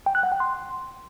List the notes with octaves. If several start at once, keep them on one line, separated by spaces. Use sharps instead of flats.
G5
F#6
F#5
G5
C6